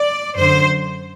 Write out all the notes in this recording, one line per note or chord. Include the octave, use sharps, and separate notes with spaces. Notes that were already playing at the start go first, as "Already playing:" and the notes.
Already playing: D5
F#2 D3 C5